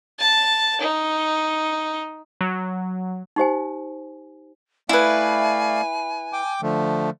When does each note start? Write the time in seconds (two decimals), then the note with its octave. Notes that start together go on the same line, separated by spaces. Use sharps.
0.19 A5
0.80 D#4
2.41 F#3
3.36 D#4 G4 C5 G#5
4.89 A3 E4 B4 D5 F5 G#5
6.33 G5 D6
6.62 D3 F3 A3